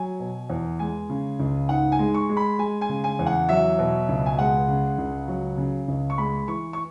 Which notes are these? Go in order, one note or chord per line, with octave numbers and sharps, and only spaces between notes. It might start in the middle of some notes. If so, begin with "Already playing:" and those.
Already playing: F#3 G#5
B2
E2
G#3 G#5
C#3
C#2
G#2 F#5
G#5
G#3
C#6
G#3
B5
G#3 G#5
G#5
C#3
G#5
E2
F#5
F#3 E5
B2
C#2
G#5
G#3 F#5
C#3
C#2
F#3
C#3
C#2
C#6
G#3 B5
E3 C#6
C#6